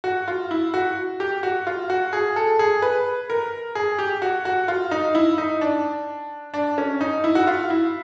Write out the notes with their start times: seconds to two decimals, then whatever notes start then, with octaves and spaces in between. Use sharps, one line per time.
0.04 F#4
0.28 F4
0.51 E4
0.74 F#4
1.20 G4
1.43 F#4
1.67 F4
1.90 F#4
2.13 G#4
2.36 A4
2.59 G#4
2.82 B4
3.30 A#4
3.75 G#4
3.99 G4
4.22 F#4
4.45 F#4
4.68 F4
4.91 D#4
5.15 E4
5.38 D#4
5.61 D4
6.54 D4
6.78 C#4
7.01 D#4
7.24 E4
7.35 F#4
7.47 F4
7.70 E4